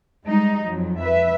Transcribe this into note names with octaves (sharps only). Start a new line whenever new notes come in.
G3 G#3 D#4
F2 F#3
B4 E5